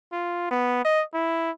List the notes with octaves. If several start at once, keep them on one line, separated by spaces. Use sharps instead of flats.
F4
B3
D#5
E4